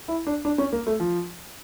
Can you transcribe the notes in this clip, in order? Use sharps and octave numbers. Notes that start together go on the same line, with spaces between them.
E4
D4
D4
C#4
A#3
A3
F3